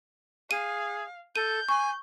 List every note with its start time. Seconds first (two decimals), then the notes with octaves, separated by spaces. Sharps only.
0.51 G#4 F5 D#7
1.36 A4 G6 D#7
1.69 G#5 C#6